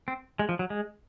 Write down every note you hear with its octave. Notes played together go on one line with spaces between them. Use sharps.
C4
G#3
F3
F#3
G#3